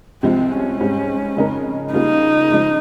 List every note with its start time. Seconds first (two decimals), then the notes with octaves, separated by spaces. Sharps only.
0.23 C2 C3 F3 G#3 C4
0.51 C#4
0.80 G#2 G3 C4
1.36 F2 C#3 G#3 D#4 A#4
1.94 C#3 G3 A#3 D#4 F4 G#4
2.51 C#3 F3 G#3